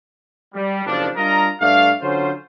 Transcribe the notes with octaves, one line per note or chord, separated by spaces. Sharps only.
G3
F#1 D#2 F3 D4
G3 D4 F4 A#4 D#5 A#5
G2 A3 D5 F5
D3 F#3 C#4 F4 C5